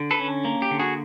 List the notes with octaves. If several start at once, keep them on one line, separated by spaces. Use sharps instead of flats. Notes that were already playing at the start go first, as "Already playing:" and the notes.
Already playing: D3
A4 B4
C#4
A#3
G4
D3
F#4 G#4